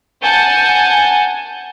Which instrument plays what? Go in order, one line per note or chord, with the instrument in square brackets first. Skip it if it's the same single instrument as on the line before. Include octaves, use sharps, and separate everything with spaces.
[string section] F#5 G#5 A5 G6